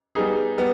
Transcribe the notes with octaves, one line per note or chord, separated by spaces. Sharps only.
G3 B3 D#4 G#4
G3 B3